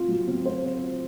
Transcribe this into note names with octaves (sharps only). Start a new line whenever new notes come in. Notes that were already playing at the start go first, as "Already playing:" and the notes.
Already playing: C4 F4
F#3
C4
C5